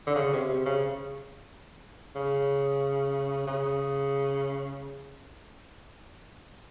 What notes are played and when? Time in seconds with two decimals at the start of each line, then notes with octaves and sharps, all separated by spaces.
0.07 D3
0.15 C#3
0.33 C3
0.49 C3
0.66 C#3
2.16 C#3
3.47 C#3